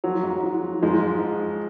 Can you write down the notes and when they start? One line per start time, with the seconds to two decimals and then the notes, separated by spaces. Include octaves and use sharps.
0.04 F3 F#3
0.23 G#2
0.43 F3
0.63 F3
0.83 G#2 F3 G#3
1.02 G#2